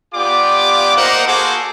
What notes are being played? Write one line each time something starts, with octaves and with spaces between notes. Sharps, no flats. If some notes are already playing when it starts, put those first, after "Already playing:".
B3 F4 G4 D5 D6
A#3 D#4 A#4 C5 F#5
A#3 F#4 G#4 A4 C5 D6